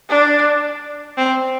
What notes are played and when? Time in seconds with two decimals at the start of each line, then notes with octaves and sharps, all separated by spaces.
0.09 D4
1.17 C4